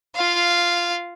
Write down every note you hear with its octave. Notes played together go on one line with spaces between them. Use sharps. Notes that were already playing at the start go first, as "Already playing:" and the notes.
F4 F5